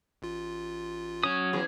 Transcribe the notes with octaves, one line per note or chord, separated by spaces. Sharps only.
A1 F4
F#3 C#4 D#6
E2 G#4